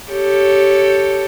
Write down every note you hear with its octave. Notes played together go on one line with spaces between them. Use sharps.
G4 A4 C#5